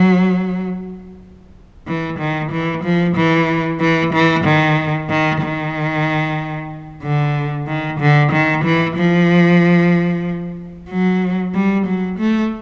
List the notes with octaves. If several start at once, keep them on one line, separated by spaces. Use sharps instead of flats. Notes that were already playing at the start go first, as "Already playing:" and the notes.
Already playing: F#3
E3
D#3
E3
F3
E3
E3
E3
D#3
D#3
D#3
D3
D#3
D3
D#3
E3
F3
F#3
G3
F#3
A3